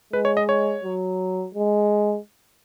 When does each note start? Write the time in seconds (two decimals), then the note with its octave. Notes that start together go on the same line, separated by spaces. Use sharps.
0.13 G#3 B4
0.25 C#5
0.37 D#5
0.49 C#5
0.84 F#3
1.54 G#3